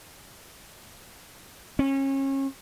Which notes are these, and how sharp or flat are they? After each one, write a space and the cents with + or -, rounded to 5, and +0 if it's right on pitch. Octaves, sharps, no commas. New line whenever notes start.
C#4 -30